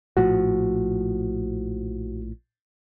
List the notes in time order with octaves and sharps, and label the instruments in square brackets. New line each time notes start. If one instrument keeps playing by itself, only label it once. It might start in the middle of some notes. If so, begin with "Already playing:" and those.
[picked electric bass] A#1 A2 F3 [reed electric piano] F#4